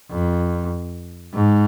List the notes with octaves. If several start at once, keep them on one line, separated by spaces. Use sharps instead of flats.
F2
G#2